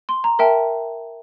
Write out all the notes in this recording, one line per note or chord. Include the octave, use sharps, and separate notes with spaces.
C6
A#5
A#4 E5 G5 A5